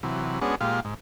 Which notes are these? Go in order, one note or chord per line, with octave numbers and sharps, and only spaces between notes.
C3 E3 F#3
G#3 B3 C#4 D4 F#4 G#4
A#2 G#3 F4 G4 F5
G#2